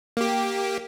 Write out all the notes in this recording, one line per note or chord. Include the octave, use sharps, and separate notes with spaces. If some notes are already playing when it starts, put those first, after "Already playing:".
A#3 G4